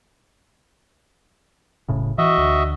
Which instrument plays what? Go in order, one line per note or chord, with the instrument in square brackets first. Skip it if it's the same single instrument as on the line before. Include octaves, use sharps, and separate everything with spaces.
[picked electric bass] E1 A2 C#3
[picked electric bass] E3 [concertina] F#4 D#5 E5
[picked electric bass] D2